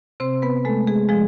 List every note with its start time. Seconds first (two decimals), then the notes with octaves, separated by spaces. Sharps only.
0.20 C3 C4 C5
0.42 B3 B4
0.65 G#3 A3 A4
0.87 G#3 G#4
1.09 F3 G#3 G#4